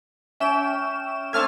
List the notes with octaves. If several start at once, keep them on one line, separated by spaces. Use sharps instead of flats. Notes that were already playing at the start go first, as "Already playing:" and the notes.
C#4 E5 G5 E7
A3 C4 D4 A5 F6 G#6